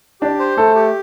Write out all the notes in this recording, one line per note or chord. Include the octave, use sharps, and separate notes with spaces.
D4 G4
C5
A3 A4
G4